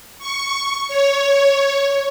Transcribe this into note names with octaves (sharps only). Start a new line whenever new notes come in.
C#6
C#5